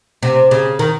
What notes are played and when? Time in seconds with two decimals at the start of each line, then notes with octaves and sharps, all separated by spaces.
0.23 C3
0.51 C#3
0.79 D#3